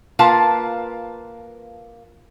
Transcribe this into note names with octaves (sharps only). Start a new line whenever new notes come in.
A#3 F4 B4 F5 A5